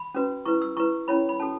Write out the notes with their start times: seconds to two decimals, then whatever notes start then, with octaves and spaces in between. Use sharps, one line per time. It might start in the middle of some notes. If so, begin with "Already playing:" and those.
Already playing: B5
0.15 C#4 F#4 B4
0.46 E4 B4 C#6
0.62 E6
0.77 E4 B4 C#6
1.08 C#4 E4 C#5 B5
1.29 B5
1.40 C#4 F#4 A4 A5